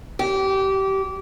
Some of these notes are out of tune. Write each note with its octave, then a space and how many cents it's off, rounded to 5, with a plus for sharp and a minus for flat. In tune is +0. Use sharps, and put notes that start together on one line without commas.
G4 -25